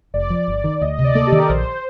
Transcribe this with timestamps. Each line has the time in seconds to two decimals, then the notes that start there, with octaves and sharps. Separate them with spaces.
0.14 F1 D5
0.30 F3
0.48 G1
0.64 D#3
0.81 D2 D#5
0.93 D#5
0.99 C3
1.04 D5
1.15 A#3 A4
1.27 G4
1.32 D#3
1.38 A#4
1.50 A#1 C5